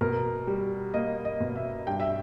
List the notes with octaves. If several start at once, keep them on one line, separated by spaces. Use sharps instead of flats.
B2 A#4
G3
A#3 D#5
D#5
B2
E5
G2 G5
E5